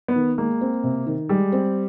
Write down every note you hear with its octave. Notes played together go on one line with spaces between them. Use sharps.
B3
D#3
G#3 A#3
C4
C3
D#3
G3 G#3
C4